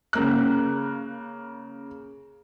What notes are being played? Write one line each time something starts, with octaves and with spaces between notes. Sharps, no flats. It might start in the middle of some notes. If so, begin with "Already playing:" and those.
C#3 A#3 F#6